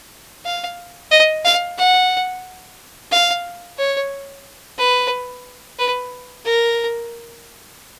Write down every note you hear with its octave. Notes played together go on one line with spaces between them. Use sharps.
F5
D#5
F5
F#5
F5
C#5
B4
B4
A#4